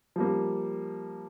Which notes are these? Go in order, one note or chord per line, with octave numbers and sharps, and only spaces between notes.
F3 G3 A#3